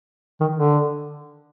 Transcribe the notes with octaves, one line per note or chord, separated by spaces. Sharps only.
D#3
D3